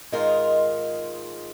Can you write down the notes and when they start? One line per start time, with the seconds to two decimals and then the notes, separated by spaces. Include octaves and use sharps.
0.12 G#2 D#3 G#3 F4 A#4